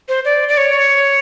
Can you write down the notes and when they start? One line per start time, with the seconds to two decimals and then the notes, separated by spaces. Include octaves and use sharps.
0.09 C5
0.25 D5
0.49 D5
0.57 C#5